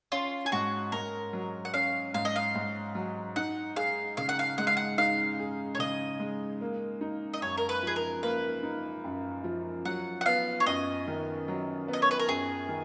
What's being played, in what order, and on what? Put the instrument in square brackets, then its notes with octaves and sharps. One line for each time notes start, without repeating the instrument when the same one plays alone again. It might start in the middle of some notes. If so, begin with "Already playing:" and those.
[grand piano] C#4 [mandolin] F4
[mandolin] G#4
[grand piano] G#2 [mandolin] F#4
[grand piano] G#2 [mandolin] A#4
[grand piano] F#3
[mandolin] F#5
[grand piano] C#4 [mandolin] F5
[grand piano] G#2 [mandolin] F5
[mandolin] D#5
F5
[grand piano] G#2
F#3
[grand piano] D#4 [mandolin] F#5
[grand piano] G#4 [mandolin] F5
[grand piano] C#3 [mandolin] F5
[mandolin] F#5
F5
[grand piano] G#3 [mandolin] F#5
[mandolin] F5
F#5
[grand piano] D#4 [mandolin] F5
[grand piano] G#4
[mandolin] C#5
[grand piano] C#3 [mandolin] D#5
[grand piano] G#3
A#3
D#4
[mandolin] D#5
[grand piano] F#2 [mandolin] C#5
[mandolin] A#4
B4
[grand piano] F3 [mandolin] G#4
[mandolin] A#4
[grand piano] A#3 [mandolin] B4
[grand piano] D#4
F#2
F3
[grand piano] F#3 [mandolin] F#5
[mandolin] F#5
[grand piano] B3 [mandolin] F5
[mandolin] C#5
[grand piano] F#2 [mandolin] D#5
[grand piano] D#3
F#3
B3
[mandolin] D#5
C#5
B4
A#4
[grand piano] F#2 [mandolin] G#4
[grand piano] D#3